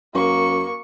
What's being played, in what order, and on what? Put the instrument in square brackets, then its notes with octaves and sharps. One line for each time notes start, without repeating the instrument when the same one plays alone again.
[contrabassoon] F#2 [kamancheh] A#3 C#6